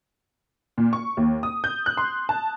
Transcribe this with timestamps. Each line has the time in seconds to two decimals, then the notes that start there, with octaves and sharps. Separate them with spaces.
0.78 A#2
0.93 C#6
1.17 D#2
1.43 D#6
1.64 G6
1.86 F#6
1.97 C6
2.29 A5